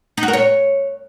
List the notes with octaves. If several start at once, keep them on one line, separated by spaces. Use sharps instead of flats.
D#4
F#4
A#4
C#5